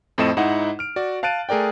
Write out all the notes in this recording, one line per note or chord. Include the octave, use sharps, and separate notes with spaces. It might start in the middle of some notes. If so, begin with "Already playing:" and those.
F2 A2 A3 C4 D#5 E7
G#2 D#4 E4 D#5 F#5
F6 D7
F#4 D5
F5 A5 F#6 A6 D7 D#7
A3 G#4 A#4 D5 G5